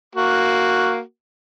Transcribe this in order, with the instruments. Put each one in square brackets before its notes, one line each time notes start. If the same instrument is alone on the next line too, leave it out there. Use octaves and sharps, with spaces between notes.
[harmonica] A#3 F#4